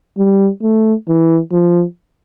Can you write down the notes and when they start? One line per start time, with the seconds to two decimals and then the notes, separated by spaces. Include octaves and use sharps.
0.18 G3
0.62 A3
1.08 E3
1.52 F3